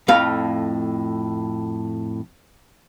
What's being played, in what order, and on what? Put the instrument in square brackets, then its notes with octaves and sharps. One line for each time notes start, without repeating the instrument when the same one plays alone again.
[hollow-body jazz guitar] F2 A2 F5